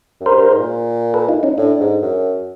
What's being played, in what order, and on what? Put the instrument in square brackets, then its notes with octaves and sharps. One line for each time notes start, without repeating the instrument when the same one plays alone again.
[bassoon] F#2
[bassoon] G2 [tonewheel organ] A#4 C5
[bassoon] G2
G#2
A#2
[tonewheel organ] A4 B4
D#4 F4
C#4 D#4
[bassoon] A2 [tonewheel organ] D4
[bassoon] G#2
F#2